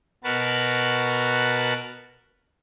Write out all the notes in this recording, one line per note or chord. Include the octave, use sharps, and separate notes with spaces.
B2 F#4 A#4 B4 A5